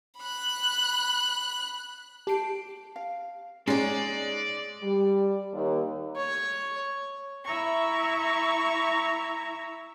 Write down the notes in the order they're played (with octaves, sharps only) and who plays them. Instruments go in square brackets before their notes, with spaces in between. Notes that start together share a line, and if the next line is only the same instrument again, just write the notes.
[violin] B5 F#6
[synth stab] G4 C7 D7 [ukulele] A5
[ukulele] F5
[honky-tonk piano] G#3 [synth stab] C#4 C#5 [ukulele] D#4 G#5 [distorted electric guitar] D5
[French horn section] G3
D#2
[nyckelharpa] C#5
[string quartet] E4 E5 A#5 C#6